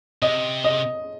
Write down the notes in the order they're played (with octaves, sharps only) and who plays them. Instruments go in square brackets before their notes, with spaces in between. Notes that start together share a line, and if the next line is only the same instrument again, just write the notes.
[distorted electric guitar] C3 [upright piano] D#5
[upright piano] D#5